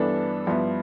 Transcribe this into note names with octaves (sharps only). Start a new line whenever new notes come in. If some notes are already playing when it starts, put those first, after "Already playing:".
Already playing: G2 E3 B3 D4 A4
G2 F3 B3 E4